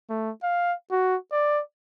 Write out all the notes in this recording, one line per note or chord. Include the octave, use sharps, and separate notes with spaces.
A3
F5
F#4
D5